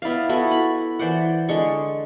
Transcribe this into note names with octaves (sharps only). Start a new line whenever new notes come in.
B3 E4 D5 F5
B3 E4 F#4 A4
B5
E3 C5 D5 F#5
D3 G#3 C#6